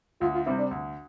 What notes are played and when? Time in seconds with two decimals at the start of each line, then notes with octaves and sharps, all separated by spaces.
0.21 D2 F4
0.34 F4
0.46 C3 G3 C4 E4
0.58 D4
0.71 D2